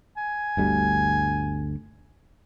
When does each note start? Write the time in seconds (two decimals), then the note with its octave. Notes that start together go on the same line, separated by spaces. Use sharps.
0.17 G#5
0.57 G1 D2 G3